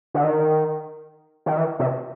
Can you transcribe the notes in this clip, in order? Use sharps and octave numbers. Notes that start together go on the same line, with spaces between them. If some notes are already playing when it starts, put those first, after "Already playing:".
D3
D#3
D#3
E3
C3